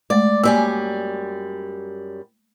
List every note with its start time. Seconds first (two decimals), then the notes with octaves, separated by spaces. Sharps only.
0.10 G#3 A3 D5
0.43 F#2 G3 A#3 G#5 E6